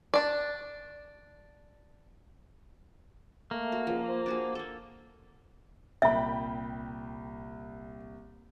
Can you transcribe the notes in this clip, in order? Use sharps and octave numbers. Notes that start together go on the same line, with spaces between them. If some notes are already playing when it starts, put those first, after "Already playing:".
D4 D5
A3 A#3
F#4
C#2 F3
C5
D4 F#4 G#4
A#3 A4
C2 A#2 E5 G5 B5